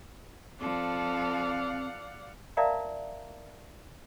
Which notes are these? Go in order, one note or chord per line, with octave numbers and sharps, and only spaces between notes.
F3 C4 A4 D5 F5 F#5
A#4 D5 E5 F5 A5 A#5